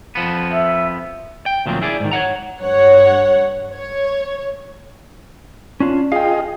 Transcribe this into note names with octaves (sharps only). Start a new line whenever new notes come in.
F2 F3 B3
E5
G5
D2 A#2 F3 F#3 C4
E4 G#4 D5
G#2 D#3
C#5 D#5 F#5 A#5
G2 C#5 F#5
C#5
C#4 D4 F4
F4 G#4 D#5 F5 G5